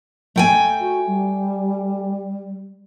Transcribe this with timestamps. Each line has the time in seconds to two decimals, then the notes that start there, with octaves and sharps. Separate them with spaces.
0.36 A3 G5 G#5
0.80 F#4
1.07 G3